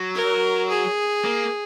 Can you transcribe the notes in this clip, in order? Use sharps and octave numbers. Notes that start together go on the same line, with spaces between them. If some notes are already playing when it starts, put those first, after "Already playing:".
Already playing: F#3
A#4
G#4
A#3